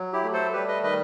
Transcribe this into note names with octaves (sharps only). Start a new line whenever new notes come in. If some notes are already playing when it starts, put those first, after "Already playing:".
Already playing: F#3
E4 G4
A3
A4 C5
G3 G4 B4
B4 D#5
D#3 B4 D#5